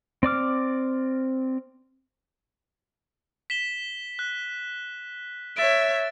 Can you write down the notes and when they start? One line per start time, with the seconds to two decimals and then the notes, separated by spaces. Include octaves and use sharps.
0.23 C4 D5 D6 F6
3.50 B6 E7 G7
4.19 F#6
5.56 C#5 E5 A6 D7